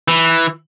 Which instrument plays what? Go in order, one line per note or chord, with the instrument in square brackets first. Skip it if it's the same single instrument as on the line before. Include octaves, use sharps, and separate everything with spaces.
[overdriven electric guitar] E3